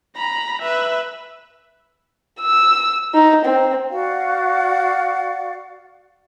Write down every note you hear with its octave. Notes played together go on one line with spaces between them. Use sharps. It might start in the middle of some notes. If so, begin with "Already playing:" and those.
A#5 B5
B4 E5
E6
D#4
C4
F#4 D5 F5 F#5